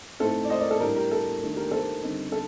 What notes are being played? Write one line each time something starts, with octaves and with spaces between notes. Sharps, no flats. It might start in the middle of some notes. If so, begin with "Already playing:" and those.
A2 A3 C4 D#4 A4 C5
D5
C5 D#5
A#4 D5
A4
A2 G3 D4 G4 A#4
G4 A#4
A4
D#3 A3 D4
G4 A#4
A4 C5
D3 G3 C4 D#4
A4